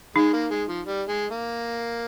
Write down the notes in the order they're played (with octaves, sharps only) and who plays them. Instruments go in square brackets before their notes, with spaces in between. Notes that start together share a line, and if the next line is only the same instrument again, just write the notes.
[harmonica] G#3 [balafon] D#4
[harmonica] A#3
G#3
F3
G3
G#3
A#3